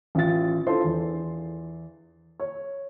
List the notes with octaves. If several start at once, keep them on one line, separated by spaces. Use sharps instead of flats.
A1 F4 A6
D4 E4 F4 A4 C5 C6
E2
C#5